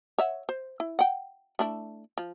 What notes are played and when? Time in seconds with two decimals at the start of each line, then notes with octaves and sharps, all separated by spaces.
0.18 C#5 E5 F#5
0.49 C5
0.80 E4
0.99 F#5 G5
1.59 A3 D4 E4
2.18 F3